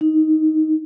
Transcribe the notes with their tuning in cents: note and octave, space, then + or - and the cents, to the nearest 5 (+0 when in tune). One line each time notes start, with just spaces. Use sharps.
D#4 +10